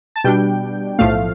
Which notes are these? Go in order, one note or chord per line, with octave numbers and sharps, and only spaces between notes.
A5
B2 G3 D4 G5
B1 A2 F3 A3 F5